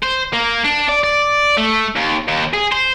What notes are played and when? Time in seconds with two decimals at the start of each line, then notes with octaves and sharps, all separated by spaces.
0.03 C5
0.33 A#3
0.64 D4
0.89 D5
1.04 D5
1.58 A3
1.96 D#2
2.28 D#2
2.54 G#4
2.72 C5